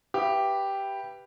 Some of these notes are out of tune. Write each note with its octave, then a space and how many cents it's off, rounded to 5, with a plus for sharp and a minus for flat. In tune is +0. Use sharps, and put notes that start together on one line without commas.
G4 +0 B4 +0 E5 +35